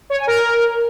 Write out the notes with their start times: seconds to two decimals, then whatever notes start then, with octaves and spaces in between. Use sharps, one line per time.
0.10 C#5
0.18 G#5
0.27 A#4